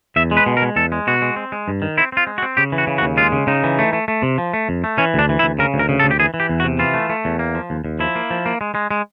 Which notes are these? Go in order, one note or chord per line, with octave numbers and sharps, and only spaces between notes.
E2 E5
G#3
B4
B2
A#4
G#3
E2 A4
G#3
B2 F#4
G#3
C4
G#3
G2
D#3
C4 E4
C4 F4
G#3
F#4
C4
C#3 G4
E3
F#4
C#3
F#4
D#2
G#3 F4
C#3
C#3 D#4
E3
A3
A3
A3
C3
F3
A3
F2
A3
E3 C#4
D2 D4
E3
E4
D2
C#3 A#4
D2
A#4
C#3
A4
D2
G4
E3 G#4
E3
G4
E2
F#4
C3
E3 F4
A3
A3
E2
A#3
F3
D#2
D#2
F3 E4
A#3
F3
A#3
G#3
G#3
G#3